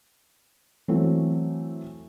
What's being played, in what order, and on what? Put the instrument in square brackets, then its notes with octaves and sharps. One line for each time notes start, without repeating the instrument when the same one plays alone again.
[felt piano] E3 F#3 A3 C4